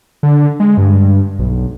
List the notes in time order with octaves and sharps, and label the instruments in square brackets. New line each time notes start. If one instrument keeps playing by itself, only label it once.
[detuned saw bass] D3
G#3
G2
B1